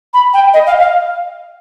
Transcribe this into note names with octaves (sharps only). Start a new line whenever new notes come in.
B5
G5
D#5
F5
F5